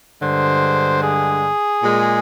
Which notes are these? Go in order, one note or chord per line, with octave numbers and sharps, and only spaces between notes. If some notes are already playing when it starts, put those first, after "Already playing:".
G2 D3 G#3 C5
G#4
A#2 G#3